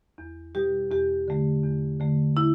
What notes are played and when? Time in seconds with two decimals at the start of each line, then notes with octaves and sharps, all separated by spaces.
0.18 E2
0.55 B2 G3 G4
0.91 E2 G4
1.28 D3 A3
1.63 E2
2.00 D3 A3
2.37 E4